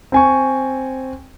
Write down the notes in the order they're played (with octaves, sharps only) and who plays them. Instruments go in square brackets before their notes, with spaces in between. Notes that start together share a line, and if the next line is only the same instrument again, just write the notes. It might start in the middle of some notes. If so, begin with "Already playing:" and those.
[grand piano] C4 G#5 C#6